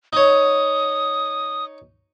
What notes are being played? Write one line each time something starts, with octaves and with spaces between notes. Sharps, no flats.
D#4 C#5 D#6